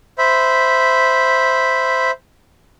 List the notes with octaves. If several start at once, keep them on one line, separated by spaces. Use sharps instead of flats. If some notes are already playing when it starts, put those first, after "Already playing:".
C5 E5 B5